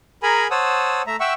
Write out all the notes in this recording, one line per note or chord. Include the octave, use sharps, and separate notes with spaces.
G#4 A#4 G#5 A#5 B5
C5 C#5 F#5 A5 D#6 E6
A3 E5 A#5
E5 F#5 G5 C#6 E6